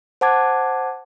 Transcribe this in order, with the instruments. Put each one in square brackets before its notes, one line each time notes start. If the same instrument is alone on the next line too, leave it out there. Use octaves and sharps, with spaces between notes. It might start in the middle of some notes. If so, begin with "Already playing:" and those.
[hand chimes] C5 F#5 A5 D6 G#6